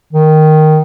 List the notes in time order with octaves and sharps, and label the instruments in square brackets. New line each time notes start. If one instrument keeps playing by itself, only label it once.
[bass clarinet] D#3